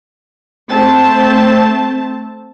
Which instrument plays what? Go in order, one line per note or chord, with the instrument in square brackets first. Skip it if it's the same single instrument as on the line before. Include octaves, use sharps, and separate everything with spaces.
[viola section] A3 C4 A5